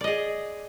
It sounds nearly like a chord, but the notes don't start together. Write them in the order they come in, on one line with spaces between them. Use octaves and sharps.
D5 D#5 G#4